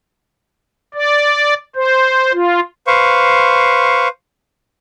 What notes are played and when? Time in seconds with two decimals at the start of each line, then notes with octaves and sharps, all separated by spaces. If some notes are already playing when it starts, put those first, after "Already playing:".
0.94 D5
1.76 C5
2.33 F4
2.87 B4 C5 F5 C#6